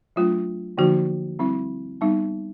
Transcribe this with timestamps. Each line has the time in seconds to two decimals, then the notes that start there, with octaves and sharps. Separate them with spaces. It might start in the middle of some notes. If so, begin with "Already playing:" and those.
0.16 F#3 A3 D4 F4
0.78 D3 F3 A#3 D#4 F#4
1.39 G3 C4 E4
2.01 G3 B3 D#4